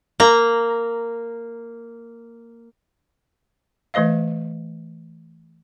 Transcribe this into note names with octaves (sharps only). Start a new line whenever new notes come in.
A#3 A#5
E3 A3 C5 D#5 F5